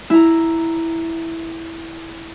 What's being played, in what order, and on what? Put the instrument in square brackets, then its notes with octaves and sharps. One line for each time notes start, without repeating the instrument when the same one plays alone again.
[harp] E4 A#5